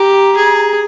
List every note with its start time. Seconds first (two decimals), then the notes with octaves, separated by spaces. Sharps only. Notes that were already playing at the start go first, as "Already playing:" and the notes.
Already playing: G4 A#5
0.37 G#4